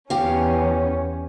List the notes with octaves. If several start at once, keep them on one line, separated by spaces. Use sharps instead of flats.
E2 C#4 G4 F5